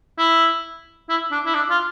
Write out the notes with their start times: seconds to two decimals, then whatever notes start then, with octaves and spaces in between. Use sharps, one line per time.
0.18 E4
1.09 E4
1.32 D4
1.46 E4
1.54 D4
1.70 F4